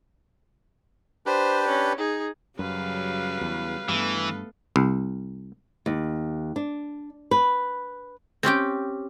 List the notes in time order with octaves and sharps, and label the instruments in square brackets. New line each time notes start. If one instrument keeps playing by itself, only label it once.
[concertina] D4 G4 B4 [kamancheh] C5
[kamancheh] C#4
D#4 G#4
[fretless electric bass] F#2 [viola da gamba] C#3 F#3 G3 [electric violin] B4 F5
[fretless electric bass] E2
[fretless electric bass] G2 [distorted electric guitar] E3 [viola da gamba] A3 B3 A4
[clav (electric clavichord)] C2
[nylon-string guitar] D#2
D4
B4
[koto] C4 C#4 G4 G5